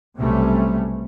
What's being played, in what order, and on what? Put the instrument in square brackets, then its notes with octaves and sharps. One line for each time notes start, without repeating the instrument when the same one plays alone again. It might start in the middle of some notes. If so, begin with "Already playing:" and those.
[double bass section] B1 C3 G3 A3 C#4